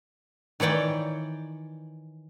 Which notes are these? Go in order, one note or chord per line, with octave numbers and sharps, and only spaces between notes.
D#3 E3 C#5 D5 G5